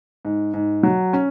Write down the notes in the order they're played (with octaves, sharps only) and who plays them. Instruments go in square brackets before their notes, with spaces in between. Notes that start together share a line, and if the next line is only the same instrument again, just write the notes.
[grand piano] G#2
G#2
F#3
C#4